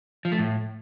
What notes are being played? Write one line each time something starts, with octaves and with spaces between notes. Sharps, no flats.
F3
A3
A2